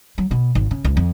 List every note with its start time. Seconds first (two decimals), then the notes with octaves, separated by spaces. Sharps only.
0.18 F#3
0.31 B2
0.55 G#1
0.71 C#3
0.84 C#2
0.97 F2